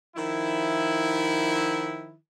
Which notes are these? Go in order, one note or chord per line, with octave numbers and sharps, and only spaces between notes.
D#3 F3 E4